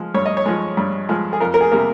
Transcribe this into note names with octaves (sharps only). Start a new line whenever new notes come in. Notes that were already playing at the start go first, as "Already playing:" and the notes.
Already playing: F3 G#3
G2 C#5
D#5
C#5
F3 G#3
G2
F3 G#3
G#4
F2 A#4
A#4
G#4
C3 G3 A#3